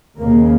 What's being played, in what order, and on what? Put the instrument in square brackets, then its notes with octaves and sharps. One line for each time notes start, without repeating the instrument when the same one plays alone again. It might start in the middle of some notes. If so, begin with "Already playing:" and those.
[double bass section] D#2 C#3 A#3